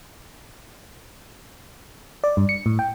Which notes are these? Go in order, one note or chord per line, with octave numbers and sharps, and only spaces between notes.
D5
G2
C#7
A2
G5